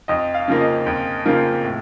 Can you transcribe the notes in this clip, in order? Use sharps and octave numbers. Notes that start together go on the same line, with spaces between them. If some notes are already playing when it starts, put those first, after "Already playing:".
F2 D#5
F5
C#3 F3 A#3
D#5
F2
C#3 F3 A#3
A2